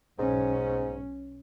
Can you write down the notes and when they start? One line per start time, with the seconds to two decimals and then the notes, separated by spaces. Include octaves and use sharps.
0.19 B1 G#2 C#4